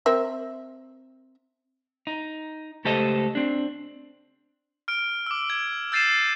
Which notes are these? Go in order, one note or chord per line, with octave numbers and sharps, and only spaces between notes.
C4 A#4 E5
D#4
C#2 A3 G4 A4 C5 D#5
C4 D4
F6 D7
D6 E6
G#6
E6 G6 A6 C7 D#7 E7